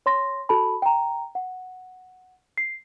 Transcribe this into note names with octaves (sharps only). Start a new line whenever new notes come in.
C#5 C6 A#6
F#4 A4 A5 B5
G5 A#5
F#5
C7